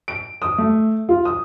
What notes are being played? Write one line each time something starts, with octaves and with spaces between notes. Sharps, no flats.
D7
D#6
A3
F4
D#6